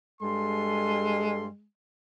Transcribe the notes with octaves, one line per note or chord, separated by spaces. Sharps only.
G2 G#3 A4 C6